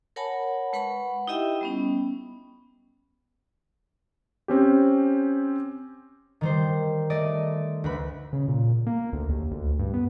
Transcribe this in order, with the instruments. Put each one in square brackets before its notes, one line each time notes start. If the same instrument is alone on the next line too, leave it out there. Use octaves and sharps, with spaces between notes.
[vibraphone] A#4 C#5 F#5 G#5 A5 B5
G#3 B4 F#5 B5 C#6
D#4 E4 G4 D#5 E5 G5
G3 B3 C#4
[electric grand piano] C4 C#4 G4
[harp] D#3 G3 C5
A3 D5 D#5
D2 B4 B5
[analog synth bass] C#3
A#2
A#3
D2
D#2
D2
G2
B3